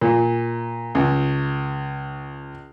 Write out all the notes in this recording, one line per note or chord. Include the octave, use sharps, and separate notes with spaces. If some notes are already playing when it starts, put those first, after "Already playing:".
A#2
C#2